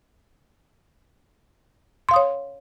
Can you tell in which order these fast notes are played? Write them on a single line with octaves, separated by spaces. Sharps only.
C6 F5 D#6 C#5